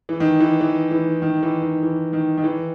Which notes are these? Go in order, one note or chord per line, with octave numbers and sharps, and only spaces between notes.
E3
D#3
E3
E3
E3
D#3
E3
D#3
E3
D#3
D#3
E3